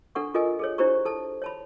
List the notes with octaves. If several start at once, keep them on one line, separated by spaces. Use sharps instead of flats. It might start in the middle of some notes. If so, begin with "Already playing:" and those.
D4 A4 F#5 C#6
F4 A4 A#4 D#5 G#5
G#4 A4 C#5
D4 E4 G4 C5 A#5 C#6
A4 A5
C#5 A5 B5